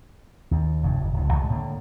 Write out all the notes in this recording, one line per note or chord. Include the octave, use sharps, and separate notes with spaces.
D#2
F1 G2
F#1
D1 C#2
C2 C#3 G#3 A3
A2 D3 A#3